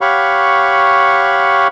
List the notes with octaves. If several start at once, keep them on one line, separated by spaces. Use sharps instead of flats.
G4 C#5 F5 F#5 B5 C#6